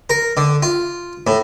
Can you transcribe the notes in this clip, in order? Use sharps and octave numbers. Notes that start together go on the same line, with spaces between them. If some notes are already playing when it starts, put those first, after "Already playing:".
A#4
D3
F4
A2